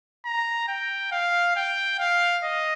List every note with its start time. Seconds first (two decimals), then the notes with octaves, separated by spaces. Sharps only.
0.25 A#5
0.68 G5
1.12 F5
1.56 G5
1.99 F5
2.44 D#5